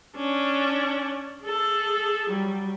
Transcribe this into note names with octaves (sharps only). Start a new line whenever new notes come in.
C#4 D4
G#4 A4
F#3 G3